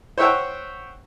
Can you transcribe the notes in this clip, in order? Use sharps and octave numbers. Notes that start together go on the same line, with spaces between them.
C5 C#5 E5 F#5 G5 C#6